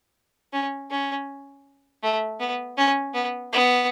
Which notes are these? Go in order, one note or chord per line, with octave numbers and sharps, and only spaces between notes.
C#4
C#4
A3
B3
C#4
B3
B3